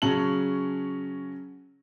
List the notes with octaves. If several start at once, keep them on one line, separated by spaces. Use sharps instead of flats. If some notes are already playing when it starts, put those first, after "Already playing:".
C#3 F#3 C#4 A5 F#7